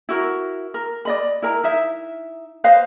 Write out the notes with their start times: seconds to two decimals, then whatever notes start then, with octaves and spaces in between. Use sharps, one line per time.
0.09 E4 F#4 A#4
0.74 A#4
1.05 D5 D#5 B5
1.42 E4 A#4 A#5
1.64 D#4 E4 E5
2.64 B4 C5 D#5 F5